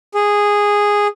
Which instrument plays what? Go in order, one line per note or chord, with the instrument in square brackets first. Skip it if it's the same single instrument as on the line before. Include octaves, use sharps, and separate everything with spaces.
[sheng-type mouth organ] G#4